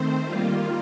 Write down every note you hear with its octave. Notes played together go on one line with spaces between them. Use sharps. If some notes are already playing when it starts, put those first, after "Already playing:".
Already playing: D#3 A3 C4 C5
D#3 G3 A#3 F4